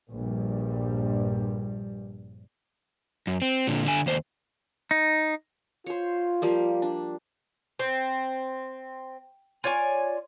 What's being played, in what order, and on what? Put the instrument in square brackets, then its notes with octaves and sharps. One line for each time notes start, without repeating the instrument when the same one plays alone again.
[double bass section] A#1 G2 G3
[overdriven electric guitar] F#2
C4
A#2 D3
D3 G#5
D#2 C5
[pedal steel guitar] D#4
[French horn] F4 [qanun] C5 C#5
[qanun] F3 G3 A#3
D4
[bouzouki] C4
F4 C#5 D5 G#5